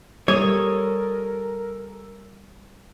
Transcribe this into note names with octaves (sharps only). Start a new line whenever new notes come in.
G3 A4 A#4 C#5 G#5 D#6